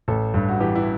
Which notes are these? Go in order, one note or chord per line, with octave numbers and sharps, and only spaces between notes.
A1 A4
G2
F#4
E3 G4
E4